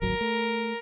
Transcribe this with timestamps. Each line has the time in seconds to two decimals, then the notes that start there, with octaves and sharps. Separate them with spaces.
0.02 D1 G#1 F#3 A#4
0.21 A3